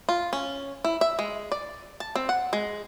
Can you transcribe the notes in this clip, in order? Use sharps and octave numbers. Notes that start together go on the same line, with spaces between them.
F4
C#4
E4
E5
G#3
D5
A5
C4
F#5
G#3